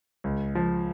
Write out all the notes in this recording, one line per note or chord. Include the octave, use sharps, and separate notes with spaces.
C#2
F3